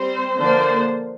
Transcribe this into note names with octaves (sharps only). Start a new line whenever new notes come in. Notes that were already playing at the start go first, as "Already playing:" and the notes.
Already playing: G3 C4 C5
D3 F3 A#3 D4 C5